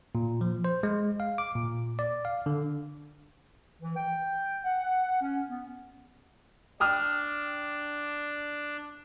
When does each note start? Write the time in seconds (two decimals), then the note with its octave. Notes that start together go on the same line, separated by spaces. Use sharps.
0.15 A#2
0.41 F3
0.64 C5
0.83 G#3
1.20 F5
1.38 D6
1.55 A#2
1.99 D5
2.25 F5
2.46 D3
3.82 E3
3.97 G5
4.65 F#5
5.22 C#4
5.48 B3
6.80 D4 G5 D#6 F6